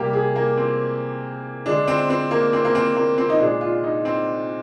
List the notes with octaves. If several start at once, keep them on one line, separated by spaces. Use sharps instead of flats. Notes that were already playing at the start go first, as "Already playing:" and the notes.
Already playing: C3 G3 A#3 G4
G#4
A#3
C4
D3 G#3 D4
C4
C4
A#3
C4
A#3
C4
A#3
C4
D#4
A#2 G#3 D4
F4
D#4
C4